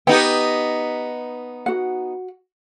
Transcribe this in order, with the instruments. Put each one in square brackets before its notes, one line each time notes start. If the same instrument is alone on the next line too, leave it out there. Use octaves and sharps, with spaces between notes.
[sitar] B3 D#4 [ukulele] G4 G5
[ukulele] F#4 F#5